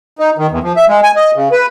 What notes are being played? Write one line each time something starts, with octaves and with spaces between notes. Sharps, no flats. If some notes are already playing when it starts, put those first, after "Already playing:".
D#4
D#3
E2
F3
E5
G#3
G#5
D#5
C#3
B4